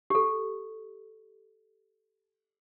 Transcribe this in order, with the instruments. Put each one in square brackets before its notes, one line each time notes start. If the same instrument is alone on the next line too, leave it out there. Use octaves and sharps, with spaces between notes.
[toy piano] G4 A4